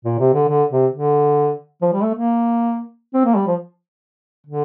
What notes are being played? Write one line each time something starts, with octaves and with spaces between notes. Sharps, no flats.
A#2
C3
D3
D3
C3
D3
F3
G3
A3
A#3
C4
A#3
G3
F3
D3